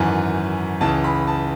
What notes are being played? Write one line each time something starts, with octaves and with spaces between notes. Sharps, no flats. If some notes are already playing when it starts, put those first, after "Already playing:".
Already playing: G#1 F#2 E3 G#5
C#2 C#3 E3 A5
B5
A5